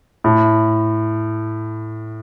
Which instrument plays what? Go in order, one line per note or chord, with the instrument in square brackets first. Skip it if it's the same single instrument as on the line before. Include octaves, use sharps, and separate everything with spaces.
[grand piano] A2